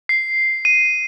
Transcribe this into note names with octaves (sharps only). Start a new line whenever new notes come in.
C7
D#7